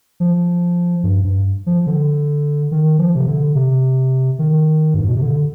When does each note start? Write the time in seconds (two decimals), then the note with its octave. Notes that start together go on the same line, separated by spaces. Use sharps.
0.20 F3
1.03 G2
1.24 G2
1.66 F3
1.87 D3
2.71 D#3
2.99 F3
3.15 C3
3.27 D3
3.55 C3
4.39 D#3
4.94 G2
5.01 G#2
5.08 B2
5.15 C3
5.21 D3